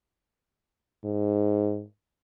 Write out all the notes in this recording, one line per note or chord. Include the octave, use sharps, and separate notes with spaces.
G#2